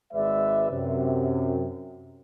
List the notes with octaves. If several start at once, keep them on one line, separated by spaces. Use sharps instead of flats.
G#1 G#3 B4 D5 E5
F#2 C3